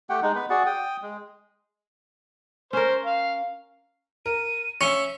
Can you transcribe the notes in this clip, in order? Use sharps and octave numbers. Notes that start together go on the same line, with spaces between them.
A3 G4 F#5 G5
G#3 D#4
B3 B4
F#4 G#4 D5 F#5
G5 D#6
G#3
C#4 A#4 C5
F5
A#4 D#7
C#4 E5 C#6 C#7 G7